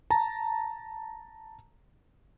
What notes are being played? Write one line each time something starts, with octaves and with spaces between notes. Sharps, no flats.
A5 A#5